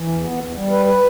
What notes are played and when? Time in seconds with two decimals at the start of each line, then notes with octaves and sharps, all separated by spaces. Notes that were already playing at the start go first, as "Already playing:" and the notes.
Already playing: E3
0.08 E2
0.23 B3
0.38 E2
0.55 G3
0.70 B4
0.86 B4